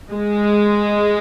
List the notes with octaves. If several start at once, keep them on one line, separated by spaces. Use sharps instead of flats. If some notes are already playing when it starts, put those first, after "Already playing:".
G#3